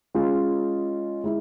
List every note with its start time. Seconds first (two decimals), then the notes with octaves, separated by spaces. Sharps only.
0.15 G#3 C#4 F4
1.24 G#3 E4